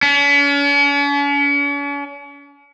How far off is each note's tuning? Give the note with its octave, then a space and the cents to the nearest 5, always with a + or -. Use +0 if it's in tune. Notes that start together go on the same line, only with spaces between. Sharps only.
C#4 +40